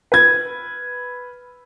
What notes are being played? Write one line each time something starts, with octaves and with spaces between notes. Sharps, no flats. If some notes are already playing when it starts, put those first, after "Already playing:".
B4 G#6